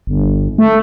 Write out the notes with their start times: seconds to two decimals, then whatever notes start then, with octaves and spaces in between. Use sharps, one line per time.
0.07 G1
0.58 A3